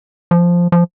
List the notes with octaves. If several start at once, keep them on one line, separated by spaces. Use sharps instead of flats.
F3
F3